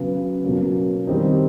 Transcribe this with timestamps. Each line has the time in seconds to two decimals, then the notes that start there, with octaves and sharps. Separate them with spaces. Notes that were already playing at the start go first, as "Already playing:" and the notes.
Already playing: C#3 F#3 B3
0.44 B2 F#3 A#3 C#4
1.07 D#3 G3 C4 D#4